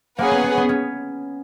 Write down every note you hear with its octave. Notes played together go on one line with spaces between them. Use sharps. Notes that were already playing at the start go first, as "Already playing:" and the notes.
A#3 C#4 G#4 B4 F#5
B3
B3
B3
C#4